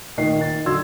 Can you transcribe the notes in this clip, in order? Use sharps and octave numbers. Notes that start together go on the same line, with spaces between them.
A#2 D#3 D#5 C7
D#4 A6
D3 F#3 C6 E6 G#6